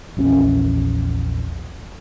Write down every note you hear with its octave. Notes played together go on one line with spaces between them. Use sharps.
A#1 E2 C4 C#4